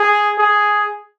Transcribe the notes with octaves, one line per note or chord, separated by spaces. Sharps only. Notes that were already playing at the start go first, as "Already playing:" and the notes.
Already playing: G#4
G#4